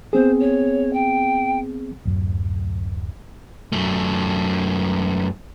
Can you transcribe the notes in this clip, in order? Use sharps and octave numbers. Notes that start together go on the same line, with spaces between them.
B3 C4 G#4 C5
C#5
G5
D1 F#2 F#3
F#2 A3